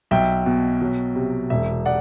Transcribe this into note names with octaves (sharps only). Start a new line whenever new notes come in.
B1 E5 G5
B2
F#3
C3
E1 E5
D5 F#5